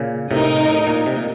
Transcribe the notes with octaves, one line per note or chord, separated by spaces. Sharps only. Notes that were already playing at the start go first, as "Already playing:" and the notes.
Already playing: A#2 C#3
A2 C3 D#4 A#4 D#5
A2
A#2
C3
A#2